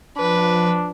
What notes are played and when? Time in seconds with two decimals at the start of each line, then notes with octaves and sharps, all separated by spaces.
0.17 F3 D4 B4